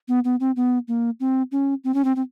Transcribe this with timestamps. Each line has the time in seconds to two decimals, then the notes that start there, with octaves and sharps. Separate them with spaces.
0.08 B3
0.24 B3
0.40 C4
0.56 B3
0.88 A#3
1.20 C4
1.52 C#4
1.84 C4
1.94 C#4
2.04 C4
2.16 C4